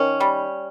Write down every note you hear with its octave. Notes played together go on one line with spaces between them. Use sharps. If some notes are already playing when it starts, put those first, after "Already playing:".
Already playing: D#3 C#4
G3